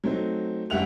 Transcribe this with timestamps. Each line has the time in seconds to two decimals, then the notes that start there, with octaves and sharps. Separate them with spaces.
0.04 F#3 A3 C4 D#4
0.70 F#1 G3 E5 F#5 F#6 F7